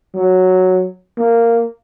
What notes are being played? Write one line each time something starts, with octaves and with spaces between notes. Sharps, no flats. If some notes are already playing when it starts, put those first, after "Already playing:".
F#3
A#3